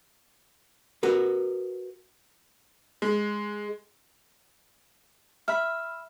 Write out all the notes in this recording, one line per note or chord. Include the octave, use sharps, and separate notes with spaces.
F#4 A#4 B4
G#3
E5 B5 F6